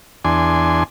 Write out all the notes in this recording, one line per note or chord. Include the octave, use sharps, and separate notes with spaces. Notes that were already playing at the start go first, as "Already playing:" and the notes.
E2 D4 G#5 C6